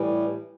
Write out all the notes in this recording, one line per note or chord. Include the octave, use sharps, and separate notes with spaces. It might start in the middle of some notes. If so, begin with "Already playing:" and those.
Already playing: A2 E3 G3